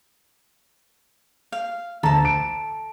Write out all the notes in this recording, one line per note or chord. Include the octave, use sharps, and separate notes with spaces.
F5
D2 A4 A5 A#5
D7